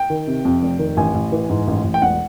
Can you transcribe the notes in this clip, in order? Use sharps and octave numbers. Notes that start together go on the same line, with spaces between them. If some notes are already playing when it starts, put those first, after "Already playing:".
Already playing: G5
D#3
C3
F2
F1
D#3
A1 G#5
A1
E3
G#2
A1
A1
G5
E1 F#5